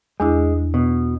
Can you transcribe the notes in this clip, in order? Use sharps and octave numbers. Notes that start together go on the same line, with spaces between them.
E2 G#3 D4 E4
B2